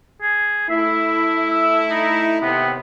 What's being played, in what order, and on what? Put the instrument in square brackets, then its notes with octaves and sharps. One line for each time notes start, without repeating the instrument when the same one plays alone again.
[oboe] G#4
[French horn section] A3 E4 [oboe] E5
[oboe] E6
D#4
[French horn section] D#2 C3 [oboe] B3